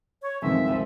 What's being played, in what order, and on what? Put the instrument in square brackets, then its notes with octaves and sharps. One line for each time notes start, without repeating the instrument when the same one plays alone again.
[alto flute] C#5
[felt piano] F2 D#3 [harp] B2 F3 G#3 [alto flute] E5
[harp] C2